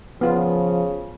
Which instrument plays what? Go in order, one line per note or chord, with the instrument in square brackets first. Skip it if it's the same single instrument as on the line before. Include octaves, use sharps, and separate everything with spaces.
[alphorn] C#3 [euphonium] F3 [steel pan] B3 F4